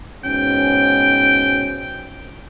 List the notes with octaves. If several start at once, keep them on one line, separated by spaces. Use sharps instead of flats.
G#2 B2 C#4 G5